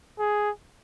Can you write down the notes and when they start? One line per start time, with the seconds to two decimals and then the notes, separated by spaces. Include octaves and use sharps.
0.19 G#4